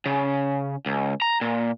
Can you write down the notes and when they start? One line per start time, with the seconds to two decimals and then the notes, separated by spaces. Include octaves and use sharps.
0.06 C#3
0.86 C#2
1.22 A#5
1.41 A#2